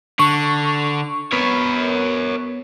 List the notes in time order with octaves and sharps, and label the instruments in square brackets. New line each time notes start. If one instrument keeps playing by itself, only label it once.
[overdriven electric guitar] D3 [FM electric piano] C#6
[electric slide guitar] B3 B4 [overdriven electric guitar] A#4 C#5